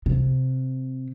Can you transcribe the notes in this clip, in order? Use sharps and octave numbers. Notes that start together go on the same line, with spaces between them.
C3